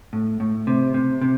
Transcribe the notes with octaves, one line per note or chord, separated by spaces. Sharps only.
A2
A2
C3
C3
C3